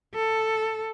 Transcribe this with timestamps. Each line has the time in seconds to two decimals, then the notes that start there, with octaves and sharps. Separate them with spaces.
0.14 A4